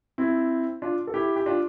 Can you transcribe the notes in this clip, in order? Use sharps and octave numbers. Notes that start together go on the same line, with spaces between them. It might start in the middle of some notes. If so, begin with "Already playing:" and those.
C4 E4
D4 F4
A4
E4 G4
G4
D4 F4